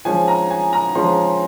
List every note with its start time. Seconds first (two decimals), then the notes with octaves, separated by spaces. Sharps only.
0.05 F3 G#3 C#4 G#5
0.28 A#5
0.50 G#5
0.73 A#5
0.95 F3 G#3 C#4 C6